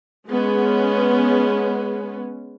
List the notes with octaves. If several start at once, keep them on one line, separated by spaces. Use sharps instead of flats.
G#3 B3 C#4